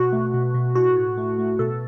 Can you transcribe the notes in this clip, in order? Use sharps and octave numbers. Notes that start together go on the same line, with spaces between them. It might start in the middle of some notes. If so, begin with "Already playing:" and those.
Already playing: B2 F#4
A3
B2
B2
A2 F#4
A2
A3
A3
B2 A4